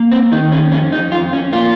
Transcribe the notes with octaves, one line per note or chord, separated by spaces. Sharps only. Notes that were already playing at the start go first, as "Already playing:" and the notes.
Already playing: A#3
C4
D#3 D#4
C#4
F2 C#4
D#4
F2 F4
C#4
A#3 F4